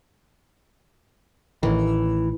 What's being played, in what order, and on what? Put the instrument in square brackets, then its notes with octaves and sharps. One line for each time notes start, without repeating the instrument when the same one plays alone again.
[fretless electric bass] A1 A2 D#3 [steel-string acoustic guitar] E3